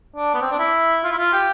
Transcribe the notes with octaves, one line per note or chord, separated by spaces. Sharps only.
D4
B3
C4
D4
E4
F4
E4
F4
G4